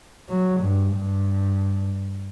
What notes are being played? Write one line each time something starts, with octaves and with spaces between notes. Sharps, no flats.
F#3
G2
G2